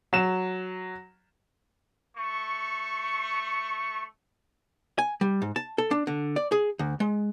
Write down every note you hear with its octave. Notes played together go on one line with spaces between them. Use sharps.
F#3 E7
A3 C#6
G#5
G3
G#2
A5
A4
D4
D3
D5
G#4
D2
G#3